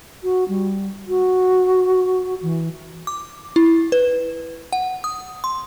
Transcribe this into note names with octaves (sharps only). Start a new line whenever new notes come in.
F#4
G3
F#4
E3
D6
E4
B4
F#5
D#6
C6